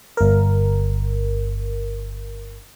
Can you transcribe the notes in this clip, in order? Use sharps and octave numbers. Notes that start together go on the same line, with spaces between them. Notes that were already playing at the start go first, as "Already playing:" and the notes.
G1 A#4